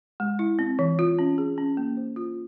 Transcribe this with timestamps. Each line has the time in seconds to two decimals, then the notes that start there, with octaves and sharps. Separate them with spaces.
0.20 G#3
0.39 E4
0.59 C4
0.79 E3
0.99 F4
1.19 C#4
1.38 G#4
1.58 C#4
1.77 A#3
1.97 C5
2.16 F4